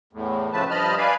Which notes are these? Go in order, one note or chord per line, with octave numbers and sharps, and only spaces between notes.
E2 A2
A2 C#3 F3 A3 B4 A5
G2 F3 D#5 A5 B5 F6
B4 D5 F5 G#5 B5